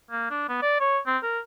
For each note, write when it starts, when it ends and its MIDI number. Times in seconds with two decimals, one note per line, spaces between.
0.11 0.25 58
0.30 0.44 62
0.49 0.61 59
0.62 0.78 74
0.80 0.98 73
1.07 1.18 60
1.23 1.39 70